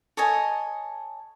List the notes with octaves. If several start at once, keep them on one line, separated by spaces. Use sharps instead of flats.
A4 C#5 D#5 G#5